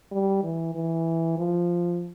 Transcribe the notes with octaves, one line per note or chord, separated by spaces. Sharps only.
G3
E3
E3
F3